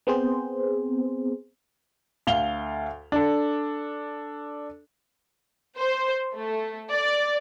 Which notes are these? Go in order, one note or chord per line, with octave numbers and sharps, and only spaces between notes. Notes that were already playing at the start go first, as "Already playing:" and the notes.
B3 C4 G#4 C5
D2 F5 F7 G7
D4 A4
C5
A3
D5